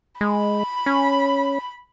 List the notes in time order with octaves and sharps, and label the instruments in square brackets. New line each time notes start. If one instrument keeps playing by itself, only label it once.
[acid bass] G#3 [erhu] B5
[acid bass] C#4